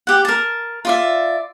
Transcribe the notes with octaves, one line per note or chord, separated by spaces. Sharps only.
G4 F#5
A#4 A5
F4 D5 E5